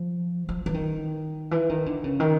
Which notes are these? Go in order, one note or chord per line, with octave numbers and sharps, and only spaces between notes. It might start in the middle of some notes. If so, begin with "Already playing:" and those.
Already playing: F3
F3
E3
D#3
E3
D#3
D3
C#3
D#3